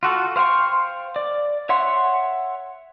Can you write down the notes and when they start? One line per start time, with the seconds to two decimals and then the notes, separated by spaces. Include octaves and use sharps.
0.03 F4 F#4 A4
0.36 C5 F5 G5 C6 C#6
1.16 D5
1.69 C#5 E5 F#5 C6